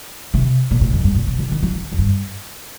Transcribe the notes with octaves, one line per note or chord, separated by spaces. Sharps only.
C3
A#2
A2
F2
G2
A#2
C3
D3
D#3
F3
F3
F2
G2